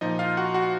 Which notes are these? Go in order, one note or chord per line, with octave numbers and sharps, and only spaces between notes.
A#2 F3 D#4 D#5
F4 F5
F#4 F#5
F#4 F#5